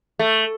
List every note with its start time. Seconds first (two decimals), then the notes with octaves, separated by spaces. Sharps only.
0.19 A3